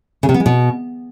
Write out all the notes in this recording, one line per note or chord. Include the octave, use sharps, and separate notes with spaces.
C#3
C3
B3
G#3
B2